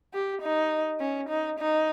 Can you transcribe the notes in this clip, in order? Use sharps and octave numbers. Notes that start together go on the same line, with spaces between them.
G4
D#4
C#4
D#4
D#4